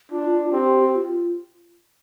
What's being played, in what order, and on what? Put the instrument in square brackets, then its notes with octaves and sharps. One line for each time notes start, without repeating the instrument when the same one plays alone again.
[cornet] D4 [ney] F4
[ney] F4
[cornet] C4 [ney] G4
[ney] G4
G4
F4